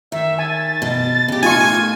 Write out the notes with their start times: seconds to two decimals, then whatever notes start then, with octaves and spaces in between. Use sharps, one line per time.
0.12 D#3 E5
0.39 G#5 A6
0.82 B2
1.28 C#3 G4
1.43 A2 D#4 F4 G#5 C#6